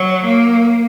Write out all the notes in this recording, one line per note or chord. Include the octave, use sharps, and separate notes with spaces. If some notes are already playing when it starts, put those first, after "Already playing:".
Already playing: F#3
A#3